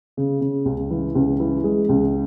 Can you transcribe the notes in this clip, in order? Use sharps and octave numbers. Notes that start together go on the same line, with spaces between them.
C#3
C#3
C#2
E3
C#2
E3
G#3
C#2